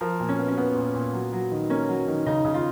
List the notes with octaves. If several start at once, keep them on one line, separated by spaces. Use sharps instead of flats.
F3 A#4
A#2
C#4
B3
C#4
B3
A#2
A#2
F#3
F#3
D#3
A#3 C#4
F#3
D#3
C#3 D#4
C#3
F4